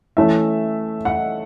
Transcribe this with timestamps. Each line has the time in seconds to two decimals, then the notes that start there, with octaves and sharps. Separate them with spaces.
0.17 E3 A3 C#4 E5
1.05 F#5